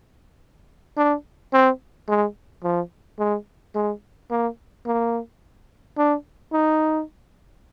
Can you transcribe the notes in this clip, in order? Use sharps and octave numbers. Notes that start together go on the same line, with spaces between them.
D4
C4
G#3
F3
G#3
G#3
A#3
A#3
D4
D#4